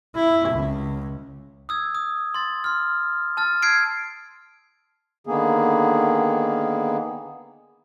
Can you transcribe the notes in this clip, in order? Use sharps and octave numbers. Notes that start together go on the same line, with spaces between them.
E4
C#2
D#6 E6 G#6
D#6
C6 A6
C6 F6
A5 F6 A6
E6 F6 G#6 C7 D7
D3 D#3 A#3 B3 G#4